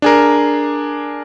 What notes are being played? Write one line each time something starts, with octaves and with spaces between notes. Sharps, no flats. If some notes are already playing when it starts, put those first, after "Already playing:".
D4 G#4 A#4